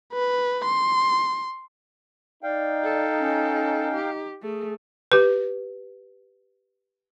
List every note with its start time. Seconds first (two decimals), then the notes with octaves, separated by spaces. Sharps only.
0.14 B4
0.65 C6
2.43 D#4 D5 F5 G5
2.84 A4
3.19 C#4
3.95 G4
4.43 A3 G#4
5.12 G4 B4